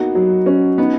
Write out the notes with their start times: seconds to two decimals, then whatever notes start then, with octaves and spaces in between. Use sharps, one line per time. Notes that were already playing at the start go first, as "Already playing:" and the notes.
Already playing: A#3 B3 D#4 F#4
0.15 F#3
0.46 C#4
0.78 B3 D#4